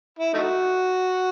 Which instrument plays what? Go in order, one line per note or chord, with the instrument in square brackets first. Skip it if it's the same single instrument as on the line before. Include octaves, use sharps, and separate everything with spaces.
[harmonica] E4
A3 D#4 F#4